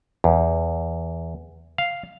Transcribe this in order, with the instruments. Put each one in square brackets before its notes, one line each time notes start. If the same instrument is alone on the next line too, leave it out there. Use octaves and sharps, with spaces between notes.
[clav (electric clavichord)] E2
F5